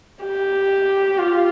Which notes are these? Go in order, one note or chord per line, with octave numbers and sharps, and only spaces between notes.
G4
F4